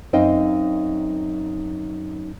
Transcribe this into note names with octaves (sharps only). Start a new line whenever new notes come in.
F#2 C4 D#4 D#5 F5 G5